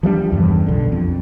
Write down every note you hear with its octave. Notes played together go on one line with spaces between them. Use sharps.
F3 G3 A3 D4
E2 G2 C#3
B1 D3
F2